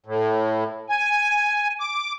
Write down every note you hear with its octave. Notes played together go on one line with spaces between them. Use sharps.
A2
G#5
D6